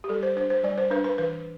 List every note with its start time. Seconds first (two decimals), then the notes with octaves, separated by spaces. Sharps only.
0.04 G4
0.09 G3 A4
0.23 C5
0.36 D4 C5
0.50 C5
0.63 G3 D5
0.78 C5
0.90 D4 B4
1.04 B4
1.18 E3 B4